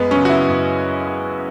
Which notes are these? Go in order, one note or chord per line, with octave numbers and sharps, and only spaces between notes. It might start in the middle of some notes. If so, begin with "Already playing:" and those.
Already playing: F#2 G#3 B3
C#3 F#3 C#4
F#4
E4
F#2